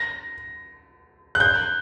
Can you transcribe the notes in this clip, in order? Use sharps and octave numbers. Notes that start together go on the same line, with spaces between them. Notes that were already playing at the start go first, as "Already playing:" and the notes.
Already playing: A#6
F#6
G6